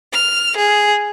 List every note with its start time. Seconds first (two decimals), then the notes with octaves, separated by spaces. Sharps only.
0.12 F6
0.57 G#4